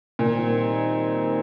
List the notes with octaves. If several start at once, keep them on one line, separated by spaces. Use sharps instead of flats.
A#2 D#3 G3 C4 D#4